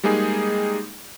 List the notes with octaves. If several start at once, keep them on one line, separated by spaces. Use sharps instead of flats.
G3 G#3 A#3 D#4 G#4